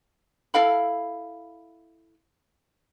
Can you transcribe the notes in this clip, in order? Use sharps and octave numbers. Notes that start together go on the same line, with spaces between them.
E4 A4 F5 B5